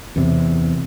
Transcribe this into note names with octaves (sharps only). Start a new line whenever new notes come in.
E2 C3